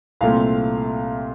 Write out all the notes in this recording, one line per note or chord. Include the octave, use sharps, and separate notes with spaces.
C2 A#2 A3 C4 F5